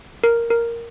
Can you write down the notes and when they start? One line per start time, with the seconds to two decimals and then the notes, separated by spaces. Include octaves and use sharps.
0.24 A#4
0.50 A#4